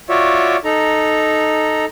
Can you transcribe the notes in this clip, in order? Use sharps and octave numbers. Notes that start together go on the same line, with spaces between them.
F4 F#4 C#5 D5 E5
D#4 A4 A#5